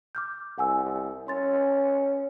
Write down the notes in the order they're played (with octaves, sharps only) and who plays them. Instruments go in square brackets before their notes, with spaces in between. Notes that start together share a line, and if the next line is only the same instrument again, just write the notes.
[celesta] D6 F6 G6
[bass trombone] C2 [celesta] F#5 G#5 E6
[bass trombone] C#4 [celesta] C6 A6